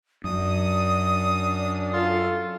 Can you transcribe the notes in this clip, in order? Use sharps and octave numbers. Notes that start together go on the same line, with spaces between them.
F#2 D4 D#6
F4 A4